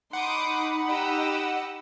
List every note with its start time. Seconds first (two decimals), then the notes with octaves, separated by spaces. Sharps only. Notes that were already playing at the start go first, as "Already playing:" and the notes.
0.13 D#4 F#5 B5 C6 D6 D#6
0.88 G4 D#5 E6